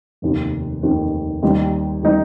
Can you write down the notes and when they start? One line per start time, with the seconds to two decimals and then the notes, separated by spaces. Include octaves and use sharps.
0.22 F1 D#2 D#3
0.82 F1 D#2 D#3
1.42 D#2 D#3 G3 D#4
2.03 D#3 G3 D#4